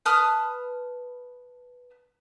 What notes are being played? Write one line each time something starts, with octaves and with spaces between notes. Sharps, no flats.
B4 A5 D#6 F6